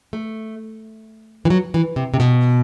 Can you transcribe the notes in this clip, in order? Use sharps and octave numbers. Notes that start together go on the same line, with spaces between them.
A3
E3
F#3
E3
C3
C3
B2